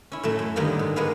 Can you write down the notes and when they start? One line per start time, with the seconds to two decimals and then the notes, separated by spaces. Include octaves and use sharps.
0.12 C#4 E4
0.23 A2 F#3 A3
0.39 F#2
0.56 D3 D#3 F#3 G3 A#3 B3
0.79 G#2
0.96 G#3 A#3 B3 B4 F5